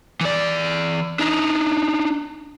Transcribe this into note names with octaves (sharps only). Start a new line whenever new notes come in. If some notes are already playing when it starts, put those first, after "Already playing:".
E3 D5
D4 D#4